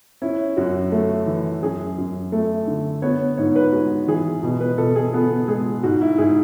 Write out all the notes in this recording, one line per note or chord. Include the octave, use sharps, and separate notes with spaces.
C#4 E4
F#2 F#4
A3
E3
F#2 G#4
F#2
A3
D3
B3 C#5
G#2 C#5
B4
G#3 F#4
E3 G#4
B2
B4
B2 A4
G#4
B3 A4
G#3 G#4
G#2 F#4
E4
G#2 G#4